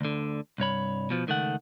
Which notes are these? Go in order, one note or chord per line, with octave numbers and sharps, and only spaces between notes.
D2 D3
C2 G2 C#5 B5
B2 F3
C#2 D#3 A3 F#5